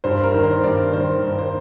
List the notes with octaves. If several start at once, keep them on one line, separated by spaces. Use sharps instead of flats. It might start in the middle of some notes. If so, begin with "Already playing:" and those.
G2 C5
A#4
D#3
C5
G2 D5
D#3 C5
G2
C5